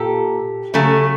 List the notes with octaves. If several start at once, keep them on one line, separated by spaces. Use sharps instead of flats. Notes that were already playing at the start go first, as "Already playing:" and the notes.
Already playing: A#2 G4 A4
C#3 F#3 A3